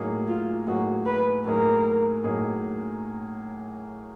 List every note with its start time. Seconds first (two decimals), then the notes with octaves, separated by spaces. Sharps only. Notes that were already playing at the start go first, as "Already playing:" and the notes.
Already playing: A2 F#3 A#3 D#4 G#4
0.28 F4
0.67 A2 F#3 A#3 D#4 F#4 G#4
1.06 B4
1.45 A2 F#3 A#3 D#4 G#4 A#4
2.24 A2 F#3 A#3 D#4 G#4